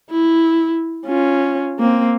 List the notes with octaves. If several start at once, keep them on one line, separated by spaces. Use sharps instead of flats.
E4
C#4 F4
A#3 C4